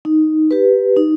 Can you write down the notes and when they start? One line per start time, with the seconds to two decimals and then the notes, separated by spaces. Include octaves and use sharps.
0.05 D#4
0.51 G4 B4
0.97 D#4